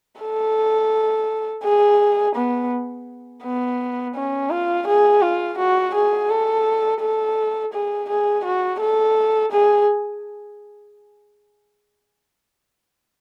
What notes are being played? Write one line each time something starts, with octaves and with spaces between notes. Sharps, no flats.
A4
G#4
B3
B3
C#4
F4
G#4
F4
F#4
G#4
A4
A4
G#4
G#4
F#4
A4
G#4